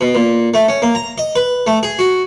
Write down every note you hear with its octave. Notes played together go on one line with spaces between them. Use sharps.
B2
A#2
A3
C#4
A#3
A#5
D#5
B4
A3
G#4
F#4